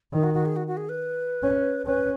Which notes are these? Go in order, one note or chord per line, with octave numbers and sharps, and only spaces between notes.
D#3 D#4
F#4
F#4
G#4
F#4
F#4
G#4
B4
C#4
C#4 B4